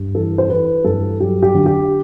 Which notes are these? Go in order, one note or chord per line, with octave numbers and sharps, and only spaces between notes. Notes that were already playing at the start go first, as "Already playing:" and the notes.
Already playing: G2
E3 A4
C5
E3 B4
G2 A4
F#3 G4
G4
D3
G4